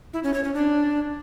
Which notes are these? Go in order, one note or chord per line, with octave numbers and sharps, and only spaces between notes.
E4
C#4
C#5
C#4
D4